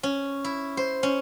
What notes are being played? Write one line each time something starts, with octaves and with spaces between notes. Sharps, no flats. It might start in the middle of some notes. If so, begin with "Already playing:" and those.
C#4
E4
C5
C#4